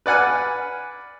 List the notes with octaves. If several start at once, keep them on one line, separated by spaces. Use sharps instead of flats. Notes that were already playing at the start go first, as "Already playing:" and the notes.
B4 D5 F#5 G#5 F6